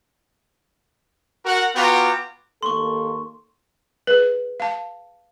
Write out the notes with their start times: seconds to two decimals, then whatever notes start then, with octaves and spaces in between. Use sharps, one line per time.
1.45 F#4 A#4 F#5
1.75 B3 F4 F#4 G5 A#5 D6
2.63 D#2 A#3 A4 C6 C#6
4.07 G#4 B4
4.60 F5 A5